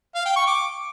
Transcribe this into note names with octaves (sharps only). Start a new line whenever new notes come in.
F5
G5
C#6
D6